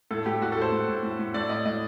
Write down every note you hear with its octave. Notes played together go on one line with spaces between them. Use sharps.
A2 A4
A2 G4
A2 F#4
A4
A2
C5
A2
A2
A2
A2
A2 D5
A2 D#5
A2 D#5